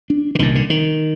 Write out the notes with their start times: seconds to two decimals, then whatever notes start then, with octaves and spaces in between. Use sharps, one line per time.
0.10 D4
0.35 D3
0.39 C2 A#2 D#3
0.55 D3
0.70 D#3